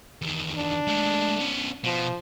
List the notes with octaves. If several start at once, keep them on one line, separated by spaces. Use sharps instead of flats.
E2 D#3
D4
G#3 A3
B3 C#4
B2 F3